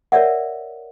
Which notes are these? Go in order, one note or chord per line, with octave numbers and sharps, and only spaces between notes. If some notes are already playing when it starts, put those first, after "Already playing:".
A#4 C#5 D5 E5 F#5